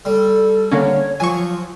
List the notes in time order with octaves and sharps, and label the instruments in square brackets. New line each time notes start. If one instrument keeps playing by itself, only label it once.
[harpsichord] G3 [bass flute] A4
[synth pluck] D3 A#3 C#4 [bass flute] C#5
[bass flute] F3 [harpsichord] F#3 [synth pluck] G#5 C#6